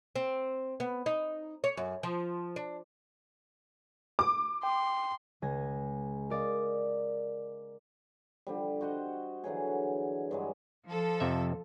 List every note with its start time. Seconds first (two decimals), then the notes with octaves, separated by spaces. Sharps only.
0.16 C4
0.80 B3
1.06 D#4
1.64 C#5
1.77 F#2
2.03 F3
2.56 D4
4.19 D6
4.63 G5 C6
5.42 C#2 G#5 A#6
6.30 A#4 D5 D#5 F5
8.47 D3 F3 G3
8.81 F#4 C5 D#5 F#5
9.44 D3 E3 F#3 G#4
10.31 G2 F#3 G#3
10.86 F3 A4
11.20 F2 C3 E5